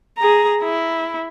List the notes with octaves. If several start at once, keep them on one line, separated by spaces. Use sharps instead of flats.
G#4 A#5
E4